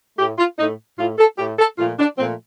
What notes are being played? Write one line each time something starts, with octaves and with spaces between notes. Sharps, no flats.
A2 A3 G4
F4
A2 A3 D#4
A2 A3 F4
A4
A2 A3 G4
A4
A#2 F3 A3 F4
D4
A#2 F3 A3 C4